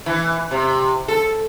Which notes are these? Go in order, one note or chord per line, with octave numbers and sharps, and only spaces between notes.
E3
C3
A4